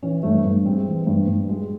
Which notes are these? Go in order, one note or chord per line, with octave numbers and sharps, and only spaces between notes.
E3 C#4
G2 A3
G2
G#3 C4
E3
G2
G2
G#3